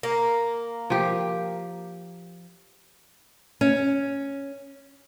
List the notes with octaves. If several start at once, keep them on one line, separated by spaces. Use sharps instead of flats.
A#3
F3 G4
C#4